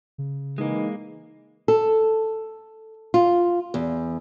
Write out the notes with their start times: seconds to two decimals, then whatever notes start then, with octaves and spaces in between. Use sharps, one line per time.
0.18 C#3
0.58 E3 G#3 A#3 D#4
1.68 A4
3.14 F4
3.74 E2